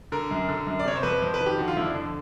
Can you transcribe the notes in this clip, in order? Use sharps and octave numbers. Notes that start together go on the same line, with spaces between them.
D3 A#4
F#2
D3
F#2
D5
C3 C#5
C5
F2 B4
F2 C5
B4
D#3
G4
D3 F#4
F4
F2 E4
D4
D3